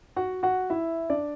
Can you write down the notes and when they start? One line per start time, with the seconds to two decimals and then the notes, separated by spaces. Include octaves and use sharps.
0.16 F#4 F#5
0.43 F#4 F#5
0.70 E4 E5
1.10 D4 D5